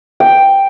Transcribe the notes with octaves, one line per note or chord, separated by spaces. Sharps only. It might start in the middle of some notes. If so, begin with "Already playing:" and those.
G5